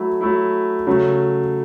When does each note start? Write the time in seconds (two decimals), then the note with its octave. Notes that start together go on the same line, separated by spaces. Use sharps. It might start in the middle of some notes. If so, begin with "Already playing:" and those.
Already playing: F#3 A3 E4
0.21 F#3 A3 E4
0.87 C#3 F#3 A3